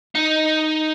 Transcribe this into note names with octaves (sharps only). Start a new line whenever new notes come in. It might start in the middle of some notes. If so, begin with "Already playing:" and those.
D#4